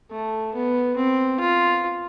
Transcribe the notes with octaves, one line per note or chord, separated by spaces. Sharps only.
A3
B3
C4
F4